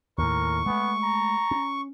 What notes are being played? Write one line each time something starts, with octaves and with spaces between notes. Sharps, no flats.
D#2 A2 A#4 C#6
G#3 A3 B3
A#5
C#4